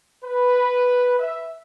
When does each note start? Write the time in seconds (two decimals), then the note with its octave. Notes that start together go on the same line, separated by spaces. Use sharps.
0.23 B4
1.19 E5